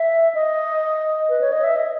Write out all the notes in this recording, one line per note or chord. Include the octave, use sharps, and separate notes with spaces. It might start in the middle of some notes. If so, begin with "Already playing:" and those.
Already playing: E5
D#5
B4
C#5
D#5
E5
D#5